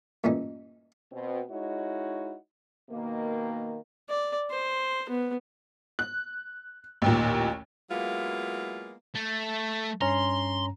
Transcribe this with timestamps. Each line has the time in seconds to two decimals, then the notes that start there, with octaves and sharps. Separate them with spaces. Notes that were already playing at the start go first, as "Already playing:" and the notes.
0.24 G2 A#2 E3 A3 C#4 D#4
1.12 B2 C4
1.50 G#3 D#4 E4 F#4 C#5
2.90 B2 D#3 A#3
4.09 D5
4.51 C5
5.09 B3
5.99 F#6
7.02 A1 D#2 A#2
7.91 F#3 G#3 A#3 B3 E4 F4
9.15 A3
10.01 G2 C#4 A#5 C6